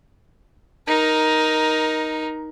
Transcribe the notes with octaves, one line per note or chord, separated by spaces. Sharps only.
D#4 A#4